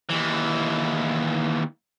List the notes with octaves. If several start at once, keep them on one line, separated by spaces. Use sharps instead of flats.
D#2 E3